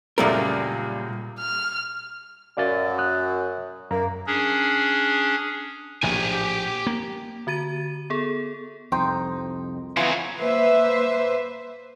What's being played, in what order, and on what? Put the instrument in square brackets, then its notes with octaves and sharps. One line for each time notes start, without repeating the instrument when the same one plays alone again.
[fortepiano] C#2 F#2 A3 [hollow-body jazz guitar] A#2 G3 A#4
[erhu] F6
[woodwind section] F#2 [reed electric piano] D5 F5 A6
[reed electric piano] D#6 F#6
[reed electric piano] F#2 A#5 [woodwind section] A#3
[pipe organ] C#4 D4 G#4
[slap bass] A#1 A2 [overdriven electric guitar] G4 G#5
[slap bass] A#3
[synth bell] D3 F#4 A6 D#7
B3 G#4 A4
[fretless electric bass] C2 F2 [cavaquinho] D#4 G5 [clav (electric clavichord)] C5
[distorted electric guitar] C#3 F#3 [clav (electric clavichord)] E3 B3 [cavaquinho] F4 G#5
[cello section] A#3 B4 C5 E5